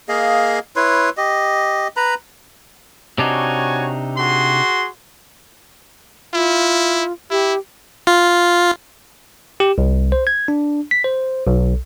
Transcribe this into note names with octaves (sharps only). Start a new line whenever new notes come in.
A#3 G#4 D#5 F5
E4 B4 C#5 C6
G4 D#5
B4 A#5 B5
C3 D4 D#4 F#4 C#5 G#5
F#4 G#4 C6
E4 F4
E4 G4
F4
G4
C2
C5
G#6
D4
B6
C5
B1